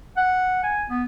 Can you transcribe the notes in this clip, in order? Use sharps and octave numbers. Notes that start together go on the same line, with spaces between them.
F#5
G#5
B3